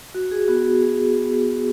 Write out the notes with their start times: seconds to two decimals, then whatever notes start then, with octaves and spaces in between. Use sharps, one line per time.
0.15 F#4
0.31 G#4
0.48 B3 F#4
0.83 F#4 G#4
1.16 B3
1.51 F#4